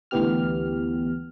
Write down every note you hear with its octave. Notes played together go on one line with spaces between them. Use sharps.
D2 E3 B3 G4 F6